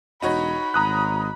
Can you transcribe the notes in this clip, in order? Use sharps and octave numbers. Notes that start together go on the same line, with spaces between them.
E1 D#4 F#4 C#5 B5
G#1 A#5 D#6 F#6